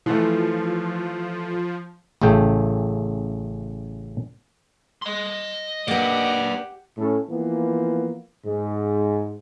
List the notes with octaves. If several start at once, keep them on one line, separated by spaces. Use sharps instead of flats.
E3 F3 A3
A1 C#3 A3 G5
D#5 C6
A#3 D4 G4 B4 D5 F#5
A2 C#4 A4
E3 F3 A#3 B3
G#2